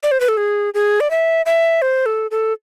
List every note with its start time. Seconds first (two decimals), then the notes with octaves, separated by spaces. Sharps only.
0.03 D5
0.11 C5
0.20 B4
0.28 A4
0.37 G#4
0.74 G#4
1.00 D5
1.11 E5
1.46 E5
1.82 C5
2.06 A4
2.31 A4